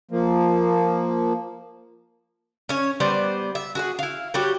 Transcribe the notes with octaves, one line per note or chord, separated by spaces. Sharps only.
F3 A#3
C#4 C#5
G3 B3 C5 D5
E5
F#4 G#4 F#5
E4 F5
G3 F#4 G4 C#5